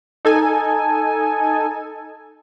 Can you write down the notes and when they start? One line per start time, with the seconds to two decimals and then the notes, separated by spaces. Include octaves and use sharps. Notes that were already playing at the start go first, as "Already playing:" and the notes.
0.25 D#4 A4 G#5